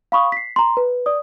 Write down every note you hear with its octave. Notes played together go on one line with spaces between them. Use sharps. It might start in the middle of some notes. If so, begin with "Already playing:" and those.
F5 B5 C#6 D#6
B6 C7
A#5 C6
B4
D5 D#6